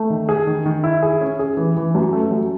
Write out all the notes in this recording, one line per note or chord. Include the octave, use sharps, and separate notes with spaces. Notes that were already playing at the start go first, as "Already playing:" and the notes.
Already playing: A3
D#3
G#4
D#3
D#3
E4
G#4
C#4
G#4
E3
E3
F#2
A3
F#2